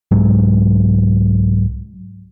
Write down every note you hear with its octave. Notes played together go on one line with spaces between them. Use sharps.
C2 G#2 F#3 G#3